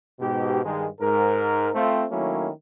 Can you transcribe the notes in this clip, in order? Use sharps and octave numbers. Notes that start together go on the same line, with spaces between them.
G#2 B2 G4
G2 D#3 G#3
G#2 A#4
A3 C4 F4
D#3 F#3 A3 A#3 C#4 E4